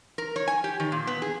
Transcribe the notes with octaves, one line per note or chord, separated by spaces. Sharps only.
A#4
C#5
G#5
G4
D#3
A#2
B3
G#4